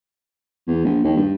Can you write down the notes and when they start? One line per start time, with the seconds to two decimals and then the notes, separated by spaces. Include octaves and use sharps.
0.67 E2
0.85 A#1
1.04 D#2
1.17 G2